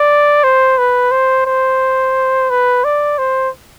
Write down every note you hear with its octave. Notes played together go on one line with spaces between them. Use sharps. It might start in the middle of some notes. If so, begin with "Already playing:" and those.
Already playing: D5
C5
B4
C5
C5
B4
D5
C5